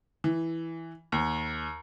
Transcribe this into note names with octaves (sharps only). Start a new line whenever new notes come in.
E3
D#2